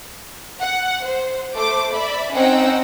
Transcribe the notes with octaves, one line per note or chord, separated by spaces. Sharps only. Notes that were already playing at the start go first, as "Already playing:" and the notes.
F#5
C5
A3 C5 D6
D5 E5 B5
C4 C#4 D#4 F#5 G5 E6